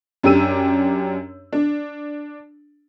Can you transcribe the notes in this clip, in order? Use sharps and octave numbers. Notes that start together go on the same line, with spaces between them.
F#2 D4 G4 E6 D#7
D4